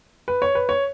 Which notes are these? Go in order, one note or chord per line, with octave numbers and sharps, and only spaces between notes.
B4
C#5
B4
C#5